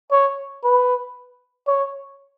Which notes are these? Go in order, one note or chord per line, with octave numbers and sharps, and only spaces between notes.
C#5
B4
C#5